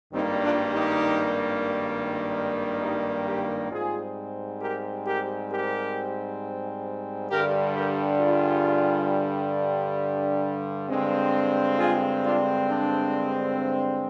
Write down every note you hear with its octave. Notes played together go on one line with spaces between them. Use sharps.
G#1 G2 D#3 G3 A#3 C4 D#4
D4 F4
D#4 G4
D#4 G4
G4 A#4
G#2 G3 C4 F4 G#4
G4 A#4
G4 A#4
G4 A#4
G2 D3 G3 G4 A#4
G4 A#4
F4 G#4
G2 D3 G#3 C4
F4 G#4
D4 F4
D4